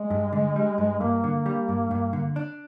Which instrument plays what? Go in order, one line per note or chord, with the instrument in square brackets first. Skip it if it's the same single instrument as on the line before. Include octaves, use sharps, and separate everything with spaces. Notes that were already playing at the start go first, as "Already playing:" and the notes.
Already playing: [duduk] G#3
[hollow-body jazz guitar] G2
D3
G3
G2
[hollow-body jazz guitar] G2 [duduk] A#3
[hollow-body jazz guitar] D3
G3
G2
G2
D3
D4